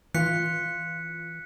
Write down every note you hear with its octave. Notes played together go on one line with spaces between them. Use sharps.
E3 F4 F#6 B6 C#7